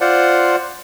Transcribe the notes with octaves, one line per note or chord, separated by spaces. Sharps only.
F4 C5 D5 F#5